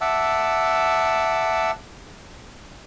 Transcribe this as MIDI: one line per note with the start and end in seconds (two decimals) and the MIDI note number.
0.01 1.71 76
0.01 1.71 78
0.01 1.71 81
0.01 1.71 86
0.01 1.71 88